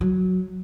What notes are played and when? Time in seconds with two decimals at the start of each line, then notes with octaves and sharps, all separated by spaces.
0.01 F#3